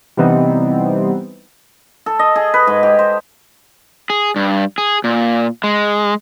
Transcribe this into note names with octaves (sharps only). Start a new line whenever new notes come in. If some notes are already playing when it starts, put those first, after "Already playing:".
C3 E3 G3 B3 C4 D#4
A4
D#5
G#4
B4
G#2
G4
C5
G#4
G2
G#4
A#2
G#3